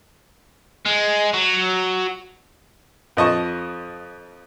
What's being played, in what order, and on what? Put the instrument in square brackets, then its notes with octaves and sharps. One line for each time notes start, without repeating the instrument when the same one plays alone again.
[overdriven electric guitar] G#3
F#3
[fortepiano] F2 F3 D#5 A5 C#6